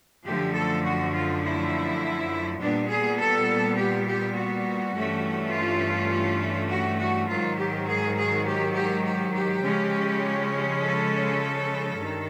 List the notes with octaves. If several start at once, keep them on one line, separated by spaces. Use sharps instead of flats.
F#2 D3 F3 A3 G4
A4
F#4
F4
E4
A#2 G3 B3 D4
G#4
A4
G4
G4
F#4
G2 E3 A3 C#4
F4
F#4
F#4
G#2 D#3 F#3 F4
G4
G#4
G#4
G4
G4
G4
G4
C#3 F3 G#3 C#4
A4
G2 D#3